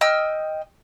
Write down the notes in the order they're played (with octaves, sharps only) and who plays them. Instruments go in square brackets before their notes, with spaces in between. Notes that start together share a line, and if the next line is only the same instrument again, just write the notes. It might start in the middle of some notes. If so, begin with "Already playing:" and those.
[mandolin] D#5 G5 E6 F6